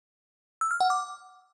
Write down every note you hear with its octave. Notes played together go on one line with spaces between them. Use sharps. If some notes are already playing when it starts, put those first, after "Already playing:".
E6
F6
F#5
D6